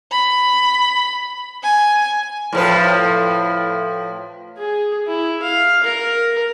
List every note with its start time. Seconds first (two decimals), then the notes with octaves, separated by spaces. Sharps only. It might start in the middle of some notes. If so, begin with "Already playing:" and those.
0.12 B5
1.63 G#5
2.52 A2 F3 B4
4.57 G#4
5.07 E4
5.42 F5
5.83 A#4